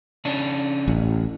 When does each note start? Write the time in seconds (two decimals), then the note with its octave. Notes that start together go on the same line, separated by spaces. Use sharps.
0.25 C#3 C#4 D4
0.88 A1